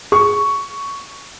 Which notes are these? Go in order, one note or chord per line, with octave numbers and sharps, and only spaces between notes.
G#4 C#6